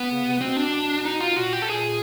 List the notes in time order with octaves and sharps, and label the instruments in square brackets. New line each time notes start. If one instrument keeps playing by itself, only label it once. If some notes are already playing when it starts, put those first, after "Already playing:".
Already playing: [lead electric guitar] B3
[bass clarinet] C#3
C3
[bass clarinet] B2 [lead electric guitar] C4
[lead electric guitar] D4
D#4
F4
[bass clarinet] A#2 [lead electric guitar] F#4
[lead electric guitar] G4
A4
[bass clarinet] A#2 [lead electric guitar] G#4